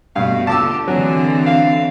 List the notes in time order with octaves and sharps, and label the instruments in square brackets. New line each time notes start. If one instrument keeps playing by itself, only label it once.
[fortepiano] G2 [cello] B2 A3 [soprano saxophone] F5
[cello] D3 G4 [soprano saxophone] F4 [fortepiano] A5 D6 E6
[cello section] D3 D4 [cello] E3 C4 [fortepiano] F#3 [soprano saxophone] G#4
[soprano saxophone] F5